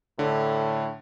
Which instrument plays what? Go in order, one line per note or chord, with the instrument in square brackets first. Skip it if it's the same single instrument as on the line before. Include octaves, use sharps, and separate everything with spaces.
[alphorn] A2 [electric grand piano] D3